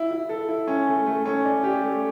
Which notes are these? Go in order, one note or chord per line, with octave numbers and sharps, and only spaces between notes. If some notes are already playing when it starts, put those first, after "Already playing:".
Already playing: E4
E4
A4
E4
C#4
A3
A3
C#4
D5
G4
A3